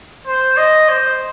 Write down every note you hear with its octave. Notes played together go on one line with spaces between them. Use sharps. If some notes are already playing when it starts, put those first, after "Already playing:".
C5
D#5
C5